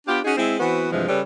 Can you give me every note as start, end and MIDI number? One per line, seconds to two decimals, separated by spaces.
0.07 0.20 59
0.07 0.20 62
0.07 0.20 65
0.07 0.20 67
0.24 0.33 61
0.24 0.33 63
0.24 0.33 66
0.24 0.33 68
0.37 0.57 56
0.37 0.57 60
0.37 0.57 64
0.60 0.89 52
0.60 0.89 59
0.60 0.89 60
0.60 0.89 66
0.91 1.07 43
0.91 1.07 48
0.91 1.07 52
0.91 1.07 53
0.91 1.07 56
1.09 1.21 49
1.09 1.21 55
1.09 1.21 69
1.09 1.21 71
1.09 1.21 73